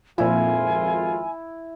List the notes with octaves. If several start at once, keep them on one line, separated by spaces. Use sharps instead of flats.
G#1 F2 A#2 F3 E4 F4 G#5